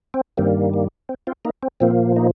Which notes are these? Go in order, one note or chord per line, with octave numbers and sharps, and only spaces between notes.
C4
G2 D#3 G3 A#3 C4
A#3
C4
C4 F4
A#3 D#4
C4
A#2 F3 A#3 C4
A#3 D#4